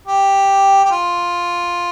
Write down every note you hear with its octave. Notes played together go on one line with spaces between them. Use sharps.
G4
G4
F4